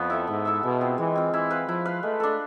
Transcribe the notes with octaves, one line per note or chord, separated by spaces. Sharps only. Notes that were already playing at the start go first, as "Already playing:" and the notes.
Already playing: F2 B3
E4 A4 E5
G#2 B3
E4 A4 E5
B2 G#3
C4 F4
E3 G#3
C4 F4
E3 E4
B4 F5
F3 E4
B4 F5
G#3 A3
D4 A4